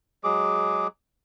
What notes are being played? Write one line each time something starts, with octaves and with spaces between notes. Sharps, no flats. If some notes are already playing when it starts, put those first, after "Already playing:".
F#3 G#3 G#4 D6